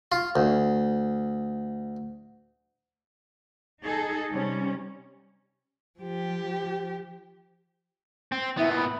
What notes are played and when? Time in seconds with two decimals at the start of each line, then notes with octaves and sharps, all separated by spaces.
0.12 F4
0.36 D2
3.84 D#4 G#4 A4
4.31 C3 G3 C#4
5.99 F3 G4
8.32 C4
8.57 A#2 B3 E4
8.76 B5